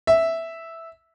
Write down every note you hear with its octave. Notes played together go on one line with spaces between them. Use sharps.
E5